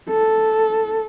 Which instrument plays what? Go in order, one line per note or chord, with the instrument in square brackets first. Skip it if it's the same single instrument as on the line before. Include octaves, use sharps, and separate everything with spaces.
[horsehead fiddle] A4